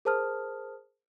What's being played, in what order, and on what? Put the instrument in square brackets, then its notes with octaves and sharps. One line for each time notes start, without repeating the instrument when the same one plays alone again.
[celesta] G#4 A#4 C5 A5 D#6 F6